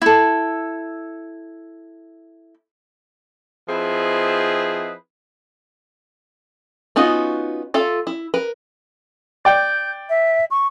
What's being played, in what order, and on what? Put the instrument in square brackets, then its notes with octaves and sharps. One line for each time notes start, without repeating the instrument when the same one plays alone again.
[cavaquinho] E4 A4
[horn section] F3 C4 E4 G#4 B4 D#5
[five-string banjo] B3 C#4 D#4 F4 F#4
F4 A4 E5
E4
A#4 B4
[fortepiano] D5 G5 [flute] G6
[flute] E5
C#6